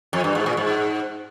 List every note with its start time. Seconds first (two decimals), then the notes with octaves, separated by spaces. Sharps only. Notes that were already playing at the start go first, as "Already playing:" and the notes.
0.13 F2
0.24 G2
0.35 G#2
0.46 A#2
0.57 G#2